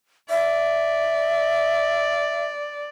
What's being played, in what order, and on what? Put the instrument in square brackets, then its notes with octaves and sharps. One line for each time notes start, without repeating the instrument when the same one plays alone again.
[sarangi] D5 [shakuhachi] E5